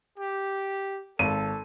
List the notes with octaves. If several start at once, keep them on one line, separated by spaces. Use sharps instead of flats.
G4
G#1 A4 D#7